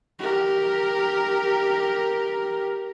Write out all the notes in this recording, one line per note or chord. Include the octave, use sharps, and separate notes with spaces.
G4 A#4